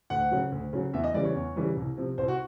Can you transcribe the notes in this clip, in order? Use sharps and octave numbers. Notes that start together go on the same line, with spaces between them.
D2 F#5
C#3 F#3
D2
C#3 F#3
E2 E5
D#5
C#3 E3 G3 D5
C#5
E2
C#3 E3 G3
C2
C3 F3
C2 C5
F#4